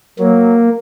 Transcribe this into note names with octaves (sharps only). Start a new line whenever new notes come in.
F#3 A#3